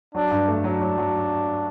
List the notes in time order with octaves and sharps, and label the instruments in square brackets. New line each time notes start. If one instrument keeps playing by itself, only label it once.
[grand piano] F#3 [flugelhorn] D4
[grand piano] G2
A3
[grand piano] F#3 [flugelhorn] D4
[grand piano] F#3
F#3